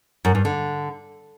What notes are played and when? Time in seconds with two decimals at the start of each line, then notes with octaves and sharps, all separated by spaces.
0.25 F#2
0.35 G2
0.45 D3